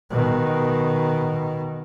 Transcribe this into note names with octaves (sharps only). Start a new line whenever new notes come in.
B2 D#3